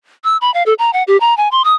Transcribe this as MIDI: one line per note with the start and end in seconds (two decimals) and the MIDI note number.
0.24 0.37 88
0.41 0.53 83
0.54 0.63 77
0.66 0.74 69
0.79 0.91 82
0.93 1.03 78
1.07 1.19 67
1.20 1.36 82
1.37 1.49 80
1.52 1.62 84
1.64 1.75 87